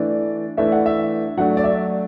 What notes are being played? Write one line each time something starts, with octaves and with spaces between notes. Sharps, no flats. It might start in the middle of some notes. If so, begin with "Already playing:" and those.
Already playing: E3 A3 D4 D5
E3 A3 D4 E5
F#5
E5
F#3 A3 D4 F#5
D5
E5